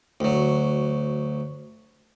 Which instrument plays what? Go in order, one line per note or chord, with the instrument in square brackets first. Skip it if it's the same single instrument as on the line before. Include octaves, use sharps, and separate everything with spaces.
[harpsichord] D2 F#3